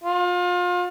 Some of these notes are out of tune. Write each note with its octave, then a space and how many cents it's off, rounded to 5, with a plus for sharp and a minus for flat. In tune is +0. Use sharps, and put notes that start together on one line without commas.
F4 +30